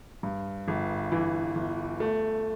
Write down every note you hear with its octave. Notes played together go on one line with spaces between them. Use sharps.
G2
G1
E3
G1
A3